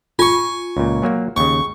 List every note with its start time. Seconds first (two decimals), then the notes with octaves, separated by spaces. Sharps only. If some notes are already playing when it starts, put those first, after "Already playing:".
0.19 F4 G#5 C#6
0.77 C#2 A#2
1.02 A#2 F#3 A#3
1.36 D#2 C#3 C#6